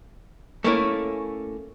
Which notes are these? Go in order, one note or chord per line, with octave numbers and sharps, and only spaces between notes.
A3 A#3 C#4 E4